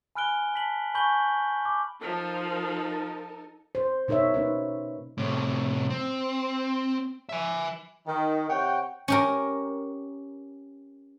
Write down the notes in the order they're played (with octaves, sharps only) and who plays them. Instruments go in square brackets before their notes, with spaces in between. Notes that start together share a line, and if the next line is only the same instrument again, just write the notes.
[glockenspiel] G#5 B5 F6 F#6 D7 G7
A5 B6 F#7
G#5 B5 C#6 G6 F#7 G7
D6
[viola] F3 [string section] D#4 A4 A#4
[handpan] C5
B2 D#4 A#4 C#5 E5
A#3 C#4 D#4 B4
[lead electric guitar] A2 C3
C4
E5 G#5
[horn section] D#3
C3 C#5 F#5 G5
[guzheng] C#4 G4 A#4